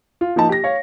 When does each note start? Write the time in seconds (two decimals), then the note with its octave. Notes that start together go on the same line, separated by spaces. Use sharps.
0.21 F4
0.36 F3 A#3 D#4 A5
0.49 G4 A#6
0.64 C#5 F5